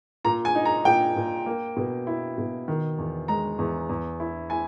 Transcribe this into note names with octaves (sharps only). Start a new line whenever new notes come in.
A#2 A#5
G#5
D#4
A#5
A#2 G5
A#2
A#3
B2
E4
B2
D#3
E2
G#3 A#5
E2
E2
E4
E4 G#5